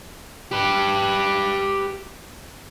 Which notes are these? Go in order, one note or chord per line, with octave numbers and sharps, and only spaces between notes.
G4 B4